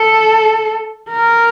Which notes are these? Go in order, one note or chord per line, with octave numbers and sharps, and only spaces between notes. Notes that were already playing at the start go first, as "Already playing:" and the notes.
Already playing: A4
A#4